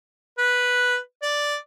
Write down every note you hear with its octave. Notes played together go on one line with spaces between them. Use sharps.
B4
D5